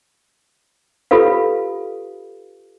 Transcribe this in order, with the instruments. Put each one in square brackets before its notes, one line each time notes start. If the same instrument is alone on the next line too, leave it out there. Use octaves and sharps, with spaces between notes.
[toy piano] F4 G4 A4 B4 F5